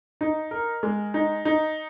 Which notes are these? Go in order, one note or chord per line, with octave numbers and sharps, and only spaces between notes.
D#4
A#4
G#3
D#4
D#4